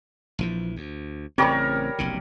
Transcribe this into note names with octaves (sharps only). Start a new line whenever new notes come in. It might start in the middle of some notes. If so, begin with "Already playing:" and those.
A#1 E3 F3
D2
A1 C#3 G3 C4 A#4 C#5
F1 B1 C#3